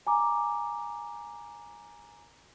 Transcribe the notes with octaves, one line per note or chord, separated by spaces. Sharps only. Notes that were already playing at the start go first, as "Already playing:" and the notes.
G#5 A#5 D6